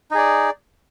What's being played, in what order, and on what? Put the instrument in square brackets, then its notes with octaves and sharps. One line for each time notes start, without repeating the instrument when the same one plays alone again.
[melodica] D#4
G#4
D5